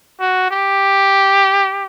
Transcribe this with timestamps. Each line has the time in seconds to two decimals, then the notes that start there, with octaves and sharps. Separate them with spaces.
0.20 F#4
0.51 G4